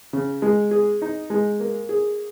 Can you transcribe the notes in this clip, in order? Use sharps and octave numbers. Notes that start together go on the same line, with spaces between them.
C#3
G#3
G#4
D#4
G#3
A#3
G#4